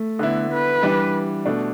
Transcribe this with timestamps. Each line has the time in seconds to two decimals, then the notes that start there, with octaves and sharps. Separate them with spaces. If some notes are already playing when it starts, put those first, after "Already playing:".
Already playing: A3
0.19 D3 B3 E4
0.51 B4
0.82 E3 G3 D4
1.46 B2 A3 D4